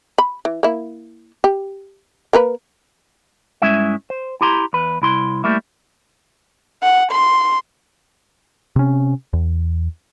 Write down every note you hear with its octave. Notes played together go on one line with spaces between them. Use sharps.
B5
E3
A#3 E4
G4
A#3 A#4 B4
G2 G#3 C#4 E4 E5
C5
E4 G4 A#5 C6
E2 B4
C2 E4 C6
G3 A3 A#3 E4
F#5
C6
C3 C#4
E2